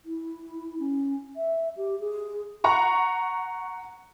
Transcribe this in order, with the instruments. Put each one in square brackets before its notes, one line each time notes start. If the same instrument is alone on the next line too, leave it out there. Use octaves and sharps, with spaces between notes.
[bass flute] E4
C#4
E5
G4
G#4
[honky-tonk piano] F#5 A#5 C#6